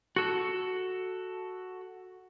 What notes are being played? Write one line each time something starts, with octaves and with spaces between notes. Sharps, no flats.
F#4 A4